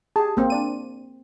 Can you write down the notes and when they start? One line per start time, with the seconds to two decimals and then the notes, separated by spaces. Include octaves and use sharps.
0.16 G4 G#4 A5
0.37 A1 A#3 C4
0.50 D4 D5 D#7